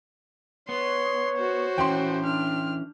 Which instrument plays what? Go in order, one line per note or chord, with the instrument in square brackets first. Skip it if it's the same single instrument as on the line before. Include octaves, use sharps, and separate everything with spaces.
[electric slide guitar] B3 [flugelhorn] C#5 [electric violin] C6
[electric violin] F#4 C5
[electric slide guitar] E3 C#4 [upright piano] G5 C6
[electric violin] D4 F6